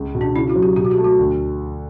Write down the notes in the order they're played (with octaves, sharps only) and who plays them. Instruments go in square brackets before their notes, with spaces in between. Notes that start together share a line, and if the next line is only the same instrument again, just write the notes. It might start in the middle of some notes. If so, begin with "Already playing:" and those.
Already playing: [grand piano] C#2
B2
[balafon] D4
[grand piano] C#3 [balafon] E4
[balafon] F#4
[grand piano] F#3
[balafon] G4
[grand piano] B2 [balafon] G4
[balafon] F#4
G4
[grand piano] A3
[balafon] F#4
[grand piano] D2